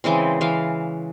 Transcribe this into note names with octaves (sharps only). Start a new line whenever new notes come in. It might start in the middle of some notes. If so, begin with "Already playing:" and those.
C#3 E3 G#3 C4
C#3 E3 F5